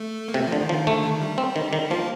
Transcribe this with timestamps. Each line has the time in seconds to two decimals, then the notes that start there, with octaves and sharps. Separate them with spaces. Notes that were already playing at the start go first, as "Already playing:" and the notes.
Already playing: A3
0.28 A#3
0.34 C3 A3
0.47 F3
0.52 D3
0.61 D#3
0.69 F3
0.73 D#3
0.87 D3 A3
1.03 D#3
1.22 G3
1.38 C4
1.56 D#3
1.73 D#3
1.90 F3 A#3